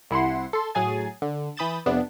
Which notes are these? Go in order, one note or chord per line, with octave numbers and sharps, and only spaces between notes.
C2 E4 F#5 C6
A4 C6
A2 F#3 G#4 G#5 A6
D3
E3 B5 D#6 G6 A6 E7
F2 C3 B3 D4